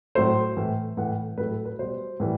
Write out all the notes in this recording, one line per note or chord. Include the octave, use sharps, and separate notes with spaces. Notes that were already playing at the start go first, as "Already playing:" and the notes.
A2 F#3 A3 C5
A2 E3 A3
A2 E3 A3 F#5
A2 F#3 A3 B4
A4
B4
B2 G3 C5
A2 E3 G3